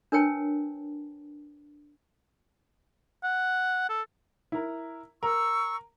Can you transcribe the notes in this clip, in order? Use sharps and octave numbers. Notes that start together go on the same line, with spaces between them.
D4 A#4 B4 C#5 G5 A5
F#5
A4
E4 A#4
A#4 C#6 E6